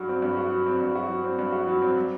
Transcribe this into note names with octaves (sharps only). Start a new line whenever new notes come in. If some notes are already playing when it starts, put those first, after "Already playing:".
Already playing: G2 F#3 F#4
C4
G2
F#4
F#3
C4
G2
F#4
F#3
C4
G2
F#4
F#3
C4
G3